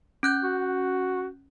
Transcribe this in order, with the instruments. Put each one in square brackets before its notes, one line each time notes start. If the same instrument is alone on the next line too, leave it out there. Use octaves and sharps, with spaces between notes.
[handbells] C#4 F#6 G6
[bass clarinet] F#4